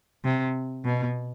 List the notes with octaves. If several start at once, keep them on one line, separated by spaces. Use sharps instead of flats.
C3
B2